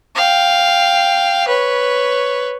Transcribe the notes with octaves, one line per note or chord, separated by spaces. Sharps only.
F5 G5
B4 C#5